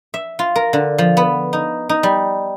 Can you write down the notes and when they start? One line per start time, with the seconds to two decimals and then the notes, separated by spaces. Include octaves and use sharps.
0.14 E5
0.39 F4
0.56 A#4
0.73 D3
0.98 F3
1.17 B3
1.53 D#4
1.89 D#4
2.03 G3